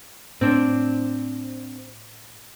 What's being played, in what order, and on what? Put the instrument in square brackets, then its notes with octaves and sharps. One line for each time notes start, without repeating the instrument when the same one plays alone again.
[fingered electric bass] A2 [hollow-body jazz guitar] C4 D4